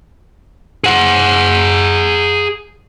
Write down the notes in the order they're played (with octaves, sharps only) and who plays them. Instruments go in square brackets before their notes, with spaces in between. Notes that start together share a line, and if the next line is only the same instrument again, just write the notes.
[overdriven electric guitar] G#4 F#5